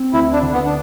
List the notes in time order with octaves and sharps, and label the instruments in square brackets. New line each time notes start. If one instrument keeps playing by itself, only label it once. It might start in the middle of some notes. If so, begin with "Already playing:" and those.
Already playing: [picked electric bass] C4
[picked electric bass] D2 [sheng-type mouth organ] E4
[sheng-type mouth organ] D4
[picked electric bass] D3
[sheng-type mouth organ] B3
D4